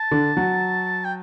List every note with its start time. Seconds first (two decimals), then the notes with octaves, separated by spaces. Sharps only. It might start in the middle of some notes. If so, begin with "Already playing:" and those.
Already playing: A5
0.11 D3 D4
0.37 F#3 F#4
1.04 G5